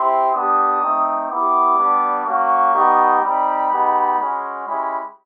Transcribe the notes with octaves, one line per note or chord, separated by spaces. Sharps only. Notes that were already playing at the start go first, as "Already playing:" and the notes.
Already playing: C4 E4 G4 C6
B3 D4 G4 D#6
A3 C4 D#4
B3 E4 G4 D6
G3 B3 D4
A#3 C#4 F#4 C#6
G3 B3 D#4 G4
G3 C4 D#4 B5
G#3 B3 D#4 G4
G#3 C#4 F#4
G#3 C#4 E4 G4 B5